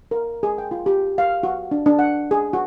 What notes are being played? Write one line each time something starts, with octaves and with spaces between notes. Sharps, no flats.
A#4
G#4
G5
F4
G4
F5
F#4
D4
D4
F#5
G#4
F#4